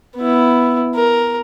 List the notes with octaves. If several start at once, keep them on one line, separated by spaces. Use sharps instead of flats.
B3 E4
A#4